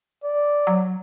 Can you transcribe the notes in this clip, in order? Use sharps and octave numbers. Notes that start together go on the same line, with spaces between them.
D5
F#3